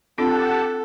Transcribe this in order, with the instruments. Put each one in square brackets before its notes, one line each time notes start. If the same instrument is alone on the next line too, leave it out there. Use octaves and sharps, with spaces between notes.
[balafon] C4 D4 F4 [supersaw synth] G4 F#5 A5 [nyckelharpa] A4